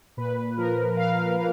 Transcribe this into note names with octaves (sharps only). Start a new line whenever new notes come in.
A#2 B4
F3 A#4
A#2 F5
A#3 F5